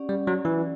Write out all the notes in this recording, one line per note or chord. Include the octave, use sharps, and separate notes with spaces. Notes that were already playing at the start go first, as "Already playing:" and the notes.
Already playing: C#4 G4 D5 F#5
G3
F#3
E3